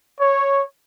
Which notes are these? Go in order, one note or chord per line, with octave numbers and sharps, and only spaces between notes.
C#5